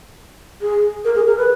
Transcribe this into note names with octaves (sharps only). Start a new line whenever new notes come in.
G#4
A#4
G#4
A#4
B4